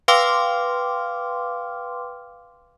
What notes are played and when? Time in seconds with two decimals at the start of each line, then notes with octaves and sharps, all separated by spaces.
0.08 B4 F5 G5 C6 D6 F6